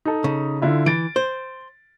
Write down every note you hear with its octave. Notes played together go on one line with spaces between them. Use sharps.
D#4 A4
C#3
D3 E4 F4
E3 A6 D7
C5